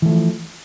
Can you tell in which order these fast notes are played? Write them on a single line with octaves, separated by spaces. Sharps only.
E3 A3 F3